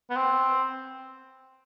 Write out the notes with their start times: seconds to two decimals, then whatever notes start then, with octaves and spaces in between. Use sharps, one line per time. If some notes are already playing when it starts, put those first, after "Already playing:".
0.10 B3
0.16 C4